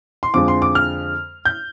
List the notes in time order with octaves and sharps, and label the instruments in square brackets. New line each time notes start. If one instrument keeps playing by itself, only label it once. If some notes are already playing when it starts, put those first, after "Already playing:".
[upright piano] C6
F2 D3 F3 G#3 D6
C6
D6
F6
G6